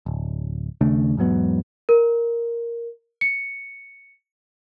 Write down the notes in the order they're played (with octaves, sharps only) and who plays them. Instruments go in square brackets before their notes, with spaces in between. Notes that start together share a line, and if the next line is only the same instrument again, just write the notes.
[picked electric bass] D1
D#2 C#3 A3 D4
E2 G#2 F#3 B3
[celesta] A#4
C#7